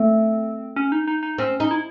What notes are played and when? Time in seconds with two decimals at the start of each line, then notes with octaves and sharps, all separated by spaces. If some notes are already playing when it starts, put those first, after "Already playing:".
Already playing: A3 C4
0.76 C#4
0.92 D#4
1.07 D#4
1.23 D#4
1.38 C4 C#4
1.60 D#4
1.71 E4